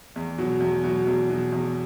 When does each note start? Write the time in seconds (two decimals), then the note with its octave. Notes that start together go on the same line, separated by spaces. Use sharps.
0.16 E2
0.38 B2 F#3
0.61 E2
0.84 B2 F#3
1.07 E2
1.29 B2 F#3
1.52 E2